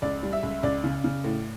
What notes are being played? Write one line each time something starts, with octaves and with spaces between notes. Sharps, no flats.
C#2 D5
G3
E5
C#2
C#2 D5
C#3
C#3
A2